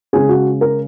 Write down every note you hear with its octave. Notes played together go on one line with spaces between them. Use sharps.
C#3 G#3 C#4 G#4
F#4
A#4